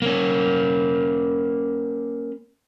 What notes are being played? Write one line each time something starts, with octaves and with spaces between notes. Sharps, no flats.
A#3 C#4